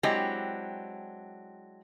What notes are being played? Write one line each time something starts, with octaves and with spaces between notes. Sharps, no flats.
F#3 G#3 C4 D4 E4 G4